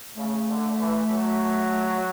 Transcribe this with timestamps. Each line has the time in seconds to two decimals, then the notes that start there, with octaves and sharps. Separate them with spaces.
0.17 C#3 A3
0.48 D3
0.79 E3
1.10 F#3